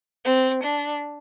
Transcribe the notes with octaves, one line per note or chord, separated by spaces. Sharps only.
C4
D4